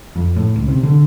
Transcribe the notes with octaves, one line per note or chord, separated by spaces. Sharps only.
F2
A2
C#2
C3
D3